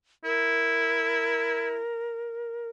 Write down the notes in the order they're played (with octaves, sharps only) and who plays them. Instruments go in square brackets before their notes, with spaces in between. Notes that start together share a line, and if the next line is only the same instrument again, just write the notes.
[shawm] E4 [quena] A#4